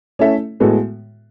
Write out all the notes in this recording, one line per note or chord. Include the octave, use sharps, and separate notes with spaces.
A3 C#4 E4 A4 E5
A2 G#3 B3 F#4 A4